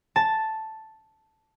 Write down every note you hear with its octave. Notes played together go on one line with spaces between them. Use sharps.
A5